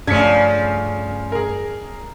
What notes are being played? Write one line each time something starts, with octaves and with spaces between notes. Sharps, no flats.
G2 C#3 F3 A3 D4 G#6 B6 C#7
G#4 A#4